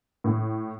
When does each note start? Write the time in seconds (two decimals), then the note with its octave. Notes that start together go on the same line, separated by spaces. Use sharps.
0.24 A2